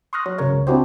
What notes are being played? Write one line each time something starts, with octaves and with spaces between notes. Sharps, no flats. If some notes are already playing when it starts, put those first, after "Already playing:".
C6 C#6 D#6 F6 F#6 A#6
F#3
G1 C#3 F#3 A#4 C#5
C#2
C4 D4 E4 F#4 G4 C5